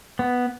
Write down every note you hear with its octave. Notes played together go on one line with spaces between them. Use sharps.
B3